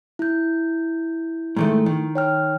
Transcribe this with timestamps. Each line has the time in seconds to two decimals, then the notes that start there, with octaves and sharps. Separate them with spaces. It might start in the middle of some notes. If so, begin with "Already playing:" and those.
0.19 E4 G6
1.56 G#2 D#3 A3
1.86 D#3
2.15 C#5 G5 F6